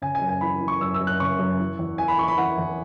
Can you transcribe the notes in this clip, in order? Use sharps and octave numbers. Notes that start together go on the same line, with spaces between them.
C#3 G#5
G#5
F#2
G#5
E3 B5
E3
C#6
F#2 E6
E6
F#2
F#6
C#3 C#6
F#2
E3
E2
E3 G#5
B5
E3 C#6
B5
E3 F#5
E2